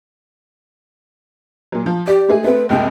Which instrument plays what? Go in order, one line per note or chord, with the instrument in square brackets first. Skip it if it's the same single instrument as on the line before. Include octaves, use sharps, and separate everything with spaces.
[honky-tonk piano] A#2 F#3
F3
[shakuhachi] G4 [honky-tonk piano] D5
[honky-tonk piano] G#3 A3 G#4
[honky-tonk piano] A3 C4 [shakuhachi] B4
[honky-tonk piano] F#1 C#2 C3 [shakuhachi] G5